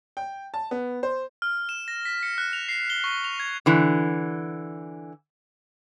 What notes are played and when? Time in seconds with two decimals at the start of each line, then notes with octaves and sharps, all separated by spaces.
0.17 G5
0.54 A5
0.71 B3
1.03 C5
1.42 F6
1.69 E7
1.88 A#6
2.05 B6
2.23 C#7
2.38 F#6
2.53 F7
2.69 C7
2.90 G7
3.04 C#6
3.24 F7
3.40 G#6
3.66 D3 E3